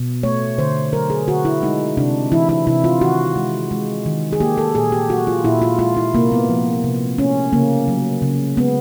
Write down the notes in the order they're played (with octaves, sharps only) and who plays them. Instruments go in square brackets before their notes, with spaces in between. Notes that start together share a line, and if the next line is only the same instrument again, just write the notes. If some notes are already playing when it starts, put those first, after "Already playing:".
Already playing: [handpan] B2
A3 C#5
D3 C5
F#3 A#4
G#4
D3 F#4
E4
G#3 D#4
C3 D4
E3 E4
E4
C3 E4
F4
D#3 F#4
G#3
G#3
D#3
G#4
A#3 G4
A4
A#2 G#4
G4
F#3 F#4
F4
A#2 E4
F4
G#3 F4
E4
C3 A#3
B3
F3
C3
A3 C#4
C#3 A#3
F#3
C#3
G#3 B3